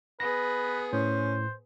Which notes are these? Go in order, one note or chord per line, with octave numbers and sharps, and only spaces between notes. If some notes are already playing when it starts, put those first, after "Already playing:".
B3 G#4 B4 A#6
A2 C#4 C5